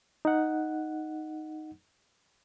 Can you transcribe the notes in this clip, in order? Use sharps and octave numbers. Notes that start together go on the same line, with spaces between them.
D#4 F#5